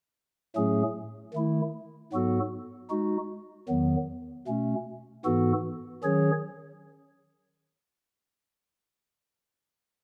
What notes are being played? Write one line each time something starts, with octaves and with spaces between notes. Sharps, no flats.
A2 F#3 A3 C#4 G#4
D#3 A3 E4
G#2 F#3 B3 F#4 A4
G#3 D#4 F#4
E2 D#3 F#3 B3
B2 A3 C#4
G#2 E3 B3 F#4 A4
D#3 F#3 C#4 G#4 C#5